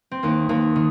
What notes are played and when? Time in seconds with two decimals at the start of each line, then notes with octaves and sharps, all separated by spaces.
0.11 C4
0.23 D#2 A#3
0.49 D#2 A#3
0.76 D#3